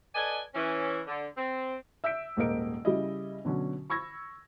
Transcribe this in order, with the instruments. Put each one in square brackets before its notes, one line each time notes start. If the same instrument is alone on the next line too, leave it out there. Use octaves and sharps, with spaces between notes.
[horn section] A4 B4 D5 D#5 G#5
E3 C#4
D3
C4
[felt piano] E5 E6 G6 B6 D7
D#1 G#2 A#3 A#4 D#5 D7
C#3 G3 E4 D#5
B2 D3 F#3 C#4
B5 C#6 E6 G#6 A#6